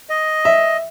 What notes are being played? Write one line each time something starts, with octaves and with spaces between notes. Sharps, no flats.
D#5
E5